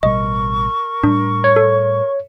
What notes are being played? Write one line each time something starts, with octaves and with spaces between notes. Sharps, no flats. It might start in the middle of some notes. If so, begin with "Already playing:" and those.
A1 B2 G3 A#4 D#5 C#6
A2 G3 D4
C#5
A4